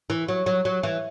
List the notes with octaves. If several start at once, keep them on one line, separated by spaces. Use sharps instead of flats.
E3
F#3
F#3
F#3
E3